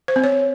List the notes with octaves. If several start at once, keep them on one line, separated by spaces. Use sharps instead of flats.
C5
C4
C#5